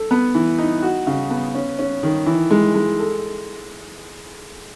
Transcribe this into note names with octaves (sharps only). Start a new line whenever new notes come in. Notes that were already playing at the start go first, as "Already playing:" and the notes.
Already playing: A4
B3
E3
D#4
F#4
C#3
B3
C#4
C#4
D#3
E3
G#3
G#3
A4